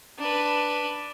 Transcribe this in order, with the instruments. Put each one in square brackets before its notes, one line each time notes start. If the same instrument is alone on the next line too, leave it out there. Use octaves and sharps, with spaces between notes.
[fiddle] D4 B4